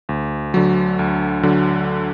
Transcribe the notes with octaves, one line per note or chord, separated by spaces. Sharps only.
D2
D3 F#3
D2
D3 F#3